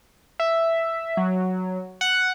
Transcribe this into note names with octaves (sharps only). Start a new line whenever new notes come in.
E5
F#3
F#5